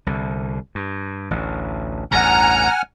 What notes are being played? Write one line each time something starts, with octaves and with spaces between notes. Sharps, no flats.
C2 D3
G2
A1 D2
A1 E2 G2 F#5 G#5 A#5 F6